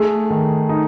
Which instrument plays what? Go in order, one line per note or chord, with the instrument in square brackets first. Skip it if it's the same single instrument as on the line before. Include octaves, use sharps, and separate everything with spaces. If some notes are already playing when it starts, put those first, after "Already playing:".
Already playing: [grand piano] A3 [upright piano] G#4
[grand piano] D#3
D#4